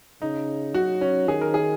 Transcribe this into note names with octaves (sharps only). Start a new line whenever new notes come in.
C#3 D#4
F#3 F#4
C#4
D#3 G#4
A#4
G#4